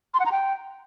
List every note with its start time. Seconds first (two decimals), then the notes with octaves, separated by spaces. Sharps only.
0.14 C6
0.20 F#5
0.26 A#5
0.32 G5